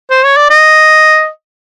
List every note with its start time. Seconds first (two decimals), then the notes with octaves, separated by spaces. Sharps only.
0.10 C5
0.24 C#5
0.37 D5
0.50 D#5